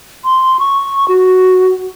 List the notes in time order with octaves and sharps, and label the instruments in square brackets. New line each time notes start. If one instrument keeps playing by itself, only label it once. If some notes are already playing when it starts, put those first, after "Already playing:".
[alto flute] C6
C#6
F#4